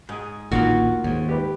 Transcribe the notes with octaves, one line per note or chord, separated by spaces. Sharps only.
G#2 G#4
A1 D2 A#2 D#3 A#3 F4 F#4
D#2 G#2
G4 B4